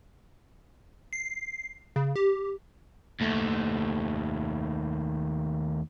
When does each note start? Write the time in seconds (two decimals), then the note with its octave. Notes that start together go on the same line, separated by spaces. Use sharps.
1.13 C7
1.96 C#3
2.16 G4
3.20 D#2 A3